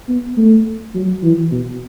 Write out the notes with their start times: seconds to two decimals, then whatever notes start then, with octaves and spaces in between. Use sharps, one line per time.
0.09 B3
0.37 A3
0.95 F#3
1.23 E3
1.52 B2